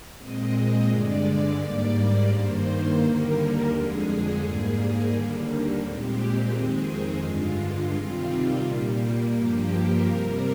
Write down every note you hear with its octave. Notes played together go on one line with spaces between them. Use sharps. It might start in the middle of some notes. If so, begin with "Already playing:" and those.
A#2 G#3 C4 D#5
G2 D3 G#3 D5
G#2 G3 A#3
G2 D#3 A#3 C5
D#2 D3 G3 A#3 A#4
F2 D3 G#3 G#4
G#2 G3 A#3
D#2 D3 G3 A#3
A#2 G#3 C4 G4
F2 D#3 G#3 C4 G#4
G2 D3 G#3 F4
C3 D#3 G3 C4
A#2 G3 A#3
G2 F3 A#3 G4
A#4
C3 G3 C4 A#4